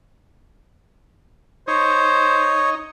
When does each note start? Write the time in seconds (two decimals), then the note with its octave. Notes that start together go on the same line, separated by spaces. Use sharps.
1.68 D#4 C5 C#5